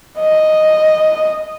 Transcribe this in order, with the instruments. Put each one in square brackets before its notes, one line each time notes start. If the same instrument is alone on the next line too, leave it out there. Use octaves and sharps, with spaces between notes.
[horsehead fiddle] D#5